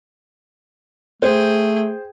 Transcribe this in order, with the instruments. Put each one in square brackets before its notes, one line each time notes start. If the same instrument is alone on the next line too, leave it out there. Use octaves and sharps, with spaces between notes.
[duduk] A3 [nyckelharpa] G#4 G5 [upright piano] C5